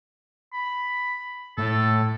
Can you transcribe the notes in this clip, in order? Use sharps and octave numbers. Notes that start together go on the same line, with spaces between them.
B5
A2 A4